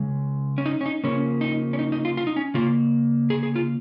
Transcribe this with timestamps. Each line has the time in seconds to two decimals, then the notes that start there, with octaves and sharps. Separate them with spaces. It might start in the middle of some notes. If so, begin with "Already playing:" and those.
Already playing: C#3 G#3
0.58 C#4
0.66 D#4
0.81 C#4
0.86 D#4
1.04 C#3 F3 A#3 C#4
1.41 D#4
1.73 C#4
1.79 D#4
1.92 D#4
2.05 F4
2.17 F4
2.27 D#4
2.36 C#4
2.54 C#3 A#3 F4
3.30 G#4
3.43 G#4
3.56 F4